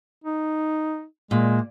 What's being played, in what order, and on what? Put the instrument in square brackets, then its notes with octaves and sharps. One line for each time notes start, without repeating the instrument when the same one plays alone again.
[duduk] D#4
[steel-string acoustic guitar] A#2 [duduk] G#3